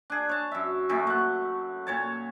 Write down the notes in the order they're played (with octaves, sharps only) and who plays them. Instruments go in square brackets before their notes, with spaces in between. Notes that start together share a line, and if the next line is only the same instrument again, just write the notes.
[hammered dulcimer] D4 G#4
C#5 A5
F#2 E5
F#2 A#2 A3
A3 F#5
A#2 C#5 A5